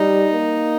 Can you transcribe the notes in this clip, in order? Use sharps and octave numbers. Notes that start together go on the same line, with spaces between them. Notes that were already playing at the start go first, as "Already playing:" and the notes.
Already playing: G3 D#4
A#3